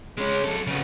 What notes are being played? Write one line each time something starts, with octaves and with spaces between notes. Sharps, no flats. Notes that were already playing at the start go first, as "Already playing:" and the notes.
G#3 C#4
F#3 A4
C#3 B3